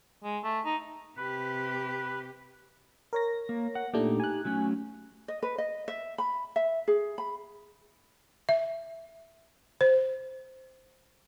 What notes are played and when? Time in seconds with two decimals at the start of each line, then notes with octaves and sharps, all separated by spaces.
0.24 G#3
0.44 A3
0.65 D#4
1.17 C3 G4 B4
3.13 A#4 C#5 A#6
3.49 A#3
3.75 F#5
3.94 A#2 A3 D4 D#4 G4
4.20 G#5 F#6
4.45 F#3 A3 C#4
5.28 D#5
5.43 B4
5.58 D#5
5.88 E5
6.18 B5
6.56 E5
6.88 G#4
7.18 B5
8.49 E5
9.81 C5